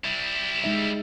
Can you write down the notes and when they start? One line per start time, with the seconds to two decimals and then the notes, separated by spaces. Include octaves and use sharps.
0.04 G3 E4
0.64 G#3 D#4 E5